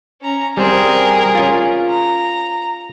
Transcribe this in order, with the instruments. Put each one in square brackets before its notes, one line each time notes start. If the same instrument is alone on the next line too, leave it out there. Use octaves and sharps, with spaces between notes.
[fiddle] C#4 A#5
[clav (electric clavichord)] G3 C4 C5 [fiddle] G#4 A#4
[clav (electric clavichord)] C#4 F4
[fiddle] A#5